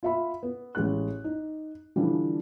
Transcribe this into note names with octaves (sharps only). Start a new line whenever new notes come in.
F4 E5 B5
B3
A1 G#3 F#6
D#4
D3 E3 F3 G3